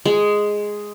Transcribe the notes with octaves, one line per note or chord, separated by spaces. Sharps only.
G#3